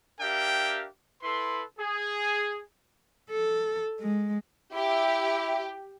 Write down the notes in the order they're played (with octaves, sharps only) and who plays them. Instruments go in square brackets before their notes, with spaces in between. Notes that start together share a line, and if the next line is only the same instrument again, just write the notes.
[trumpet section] D4 G4 A#4 E5 F5 G5
E4 A4 B4 C6
G#4
[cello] A4
G#3
[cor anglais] E4 [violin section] G4 [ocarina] E5